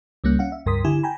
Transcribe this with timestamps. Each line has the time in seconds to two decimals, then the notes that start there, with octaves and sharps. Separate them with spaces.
0.24 C#2 G3 A#3 C#4 F#6
0.39 C#4 F5 F#5
0.52 E5
0.66 C#2 G2 A#4 C6 D#6 B6
0.84 D3 E4 G4 G#5
1.03 G5 G#5 A#5 B5